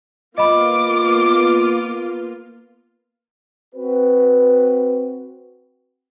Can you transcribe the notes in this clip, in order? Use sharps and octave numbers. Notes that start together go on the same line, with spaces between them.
A#3 B3 F4 D#5 B5 D6
C4 F#4 B4